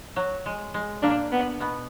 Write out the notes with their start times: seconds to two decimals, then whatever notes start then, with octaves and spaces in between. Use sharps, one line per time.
0.16 F#3
0.46 G#3
0.74 G#3
1.02 A#2 A#3 D4
1.32 B3
1.60 B2 B3